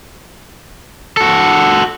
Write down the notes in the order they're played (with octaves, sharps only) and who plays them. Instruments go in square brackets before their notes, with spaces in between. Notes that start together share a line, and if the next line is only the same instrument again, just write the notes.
[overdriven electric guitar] F#4 A4